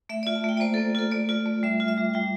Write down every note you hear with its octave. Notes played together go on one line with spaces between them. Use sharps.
A3 E5
D5
F4
A5
A3 G5
D5
A#3 C5
A4
A#3
F4 A4
A3 D5
F4
A3
G3 E5
F4
E5
G3
G3 G5